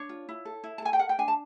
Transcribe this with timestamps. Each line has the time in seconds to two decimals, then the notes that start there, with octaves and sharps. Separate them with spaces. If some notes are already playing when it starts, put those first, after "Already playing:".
Already playing: D4 C#5
0.09 F4
0.29 E4
0.45 A4
0.64 E4
0.78 A5
0.82 A4 G#5
0.93 G5
0.99 A#4 F#5
1.09 G5
1.18 D4 G#5
1.28 A5